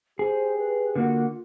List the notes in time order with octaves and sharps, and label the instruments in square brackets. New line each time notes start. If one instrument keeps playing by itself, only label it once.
[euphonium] G4 [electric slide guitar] G#4 [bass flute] C5
[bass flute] B4
[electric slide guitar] D3 A#3 F#4 [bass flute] F4